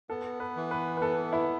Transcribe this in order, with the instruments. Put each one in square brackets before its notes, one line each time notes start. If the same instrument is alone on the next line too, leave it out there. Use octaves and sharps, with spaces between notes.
[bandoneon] B3 [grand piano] A4
[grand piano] B4
[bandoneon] E3
[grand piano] B4
B4
[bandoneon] B3 [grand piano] A4
[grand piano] E4